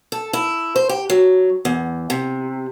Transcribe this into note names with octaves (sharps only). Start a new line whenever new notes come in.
A4
E4
C5
G4
F#3
E2
C3